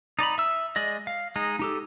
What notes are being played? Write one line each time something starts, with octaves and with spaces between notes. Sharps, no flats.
D#4 D5 A#5 B5
E5 E6
G#3 D5 D#5
F5
G#3 D#4
D#4 G4 A4